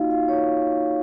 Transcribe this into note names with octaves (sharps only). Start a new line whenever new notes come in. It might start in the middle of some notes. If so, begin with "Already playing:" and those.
Already playing: A#3 D#4 F4 F#4 D#5 F5
F4 F5
C#5 C#6